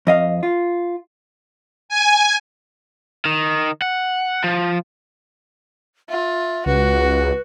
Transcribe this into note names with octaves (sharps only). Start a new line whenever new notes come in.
F2 D#5 F5
F4
G#5
D#3
F#5
F3
F4 E5
C#2 F#4 B4